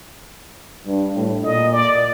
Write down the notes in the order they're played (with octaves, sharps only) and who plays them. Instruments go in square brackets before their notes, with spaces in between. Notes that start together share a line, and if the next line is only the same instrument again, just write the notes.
[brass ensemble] G2
A2
[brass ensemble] A#2 [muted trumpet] D#5
[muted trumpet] D5